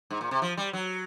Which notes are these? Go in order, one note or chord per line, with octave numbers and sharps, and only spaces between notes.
G#2
A#2
C3
F3
G3
F#3